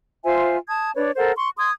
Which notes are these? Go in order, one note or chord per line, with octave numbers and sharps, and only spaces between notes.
F4 C5 E5 G#5
A5 D#6 G#6
D4 B4 C#5 D5
A4 A#4 C5 F#5
C6 C#6
C6 D#6 G#6